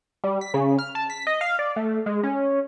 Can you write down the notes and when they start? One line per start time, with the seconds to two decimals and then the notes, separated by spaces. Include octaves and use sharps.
0.24 G3
0.41 B6
0.54 C#3
0.79 F6
0.95 A5
1.10 B6
1.27 D#5
1.41 F5
1.59 D5
1.76 A3
2.06 G#3
2.23 C#4